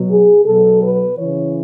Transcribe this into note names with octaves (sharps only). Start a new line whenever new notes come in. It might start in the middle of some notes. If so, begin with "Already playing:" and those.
Already playing: B2 F#3
G#4
B2 F#3 A4
B4
C#3 E3 C#5